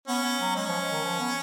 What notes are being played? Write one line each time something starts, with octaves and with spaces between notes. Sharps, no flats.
B3 C#4
B3
F#3
G#3 C#4
F3
F3
D#3
F3
B3